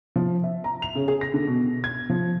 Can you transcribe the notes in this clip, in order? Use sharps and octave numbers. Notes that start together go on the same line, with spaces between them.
F3
E5
A#5
F7
C#3
G#4
A#6
D3
B2
B2
G#6
F3